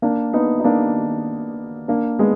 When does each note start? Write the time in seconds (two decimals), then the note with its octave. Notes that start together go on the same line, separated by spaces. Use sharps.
0.02 A#3 D4
0.33 B3 D#4
0.60 D#4
0.64 A#3 D4
1.88 A#3 D4
2.19 G#3 B3